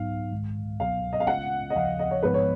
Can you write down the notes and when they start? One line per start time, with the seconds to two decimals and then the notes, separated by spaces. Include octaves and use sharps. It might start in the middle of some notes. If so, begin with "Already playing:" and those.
Already playing: G#2 F#3 B3 D#4 F5
0.31 G#2 D#3 G#3
0.80 C#2 B2 F#3 B3 F5
1.13 D#5
1.20 F5
1.27 C#3 G#3 C#4 F4 F#5
1.70 D#5
1.76 D#2 C#3 F3 F5
1.99 D#5
2.11 C#5
2.23 G#2 F3 G#3 B3 D#4 B4
2.34 C#5